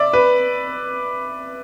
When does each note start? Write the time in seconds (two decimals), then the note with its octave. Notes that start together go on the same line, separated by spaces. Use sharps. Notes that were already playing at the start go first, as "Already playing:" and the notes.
Already playing: D5 E5
0.13 B4